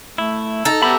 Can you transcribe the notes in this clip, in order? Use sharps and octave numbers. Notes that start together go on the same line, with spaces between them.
A3 E4
D#4 A4 A#5
G3 B3 E5 A#5 B5